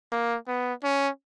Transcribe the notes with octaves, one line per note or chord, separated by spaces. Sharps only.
A#3
B3
C#4